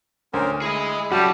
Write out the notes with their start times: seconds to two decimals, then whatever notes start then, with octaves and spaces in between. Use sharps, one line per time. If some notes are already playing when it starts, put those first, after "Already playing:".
0.34 D2 C#4 A#4 C5
0.62 E4 G#4 D#5
1.12 F#2 G3 F#4 A5